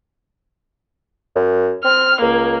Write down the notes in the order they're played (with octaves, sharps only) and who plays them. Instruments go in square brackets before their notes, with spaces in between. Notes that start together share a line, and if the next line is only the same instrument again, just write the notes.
[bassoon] F#2
[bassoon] C4 [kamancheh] F6
[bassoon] C#2 [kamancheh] A#3